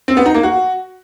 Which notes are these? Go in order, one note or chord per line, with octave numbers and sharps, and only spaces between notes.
C4
B3
D#4
A#3
F#4